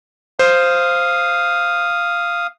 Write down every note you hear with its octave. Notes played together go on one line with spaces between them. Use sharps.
C5 F5 D#6